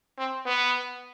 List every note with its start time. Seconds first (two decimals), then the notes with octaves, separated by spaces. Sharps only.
0.18 C4
0.46 B3